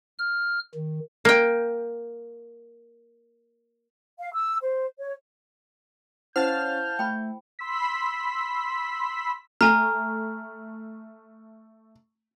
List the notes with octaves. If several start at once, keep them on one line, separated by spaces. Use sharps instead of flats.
F6
D#3
A#3 G5
F5
E6
C5
C#5
C#4 E4 C5 F5 F#5 A5 F6 G6
A3 G5 B5
B5 C6 E6 B6
A3 G#5 A#5 F6